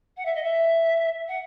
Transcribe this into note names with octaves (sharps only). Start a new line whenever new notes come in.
F#5
E5
D#5
E5
F#5